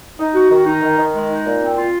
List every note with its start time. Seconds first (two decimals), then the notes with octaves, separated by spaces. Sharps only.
0.19 D#4
0.34 F#4
0.50 D#3
0.66 D#4
0.83 D#3
0.98 D#3
1.14 G#3
1.31 D#4
1.46 A#2
1.62 C4
1.78 F4